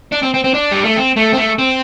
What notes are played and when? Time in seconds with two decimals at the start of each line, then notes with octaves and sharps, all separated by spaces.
0.12 D4
0.23 C4
0.34 C4
0.44 C4
0.54 D4
0.71 G3
0.84 A3
0.96 C4
1.16 A3
1.32 C4
1.37 A3
1.58 C4